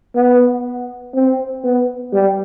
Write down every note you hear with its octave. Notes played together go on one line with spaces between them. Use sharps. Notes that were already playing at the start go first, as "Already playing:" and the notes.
B3
C4
B3
G3